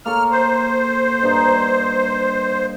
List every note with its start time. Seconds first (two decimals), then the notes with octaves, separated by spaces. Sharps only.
0.06 A#3 A4 C#5 F6
0.31 C5
1.23 G2 D#4